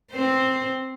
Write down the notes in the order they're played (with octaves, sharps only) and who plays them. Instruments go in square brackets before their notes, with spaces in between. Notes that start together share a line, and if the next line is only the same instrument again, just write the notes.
[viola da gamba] C4 C5